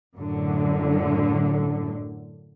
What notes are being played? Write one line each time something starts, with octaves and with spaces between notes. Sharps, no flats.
F#2 A2 D3